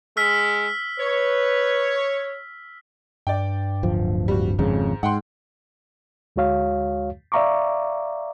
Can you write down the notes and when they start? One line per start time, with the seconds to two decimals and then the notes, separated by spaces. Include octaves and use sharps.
0.17 G#3 E6 F6 B6
0.99 B4 C#5
3.27 G2 D5 G5
3.83 D1 F3
4.28 G3 F#4
4.59 G#1 F2 G#2 C#3
5.03 G#2 F#5 G5 C6
6.36 D2 G#3 F#4 C#5 F5
7.32 D5 E5 F5 A#5 C#6 D6